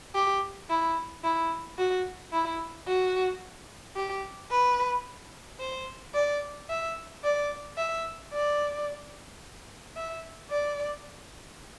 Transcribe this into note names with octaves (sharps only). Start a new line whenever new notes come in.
G4
E4
E4
F#4
E4
F#4
G4
B4
C5
D5
E5
D5
E5
D5
E5
D5